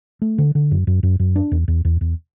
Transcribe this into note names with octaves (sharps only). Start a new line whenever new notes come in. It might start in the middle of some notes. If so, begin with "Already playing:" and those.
A3
D3
D3
F#2
F#2
F#2
F#2
D4
E2
E2
E2
E2